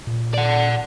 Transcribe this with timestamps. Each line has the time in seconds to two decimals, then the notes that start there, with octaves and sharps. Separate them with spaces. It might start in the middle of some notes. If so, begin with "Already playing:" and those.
0.07 A#2
0.34 D5 F#5